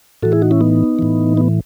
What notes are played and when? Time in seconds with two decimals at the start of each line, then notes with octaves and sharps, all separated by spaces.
0.22 A2 E3 F#4 A4
0.32 E4 G#4
0.42 D#4 F#4
0.51 C#4 E4
0.61 B3 D#4
0.99 A2 E3
1.37 B3